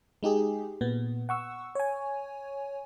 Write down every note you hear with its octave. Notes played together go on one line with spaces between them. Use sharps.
G#3 D#4 G4 G#4
A#2 B3
F#5 C#6 E6
C#5 G#5